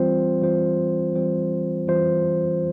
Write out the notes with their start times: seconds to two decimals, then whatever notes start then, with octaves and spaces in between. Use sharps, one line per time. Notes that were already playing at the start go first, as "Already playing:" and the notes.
Already playing: E3 G3 C4 F4 C5
0.42 E3 G3 C4 F4 C5
1.16 E3 G3 C4 F4 C5
1.88 E3 G3 C4 F4 C5